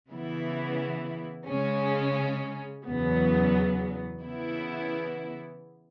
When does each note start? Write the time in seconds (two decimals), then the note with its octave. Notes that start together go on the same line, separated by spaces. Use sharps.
0.10 C#3 E3 B3 E4
1.47 C#3 G#3 C#4
2.86 E2 C#3 F#3 B3
4.23 C#3 E3 B3 E4